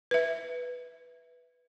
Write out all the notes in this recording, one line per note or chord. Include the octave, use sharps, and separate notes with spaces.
B4 E5